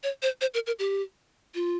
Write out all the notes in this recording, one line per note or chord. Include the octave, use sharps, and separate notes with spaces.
C#5
C5
C5
A#4
A#4
G4
F4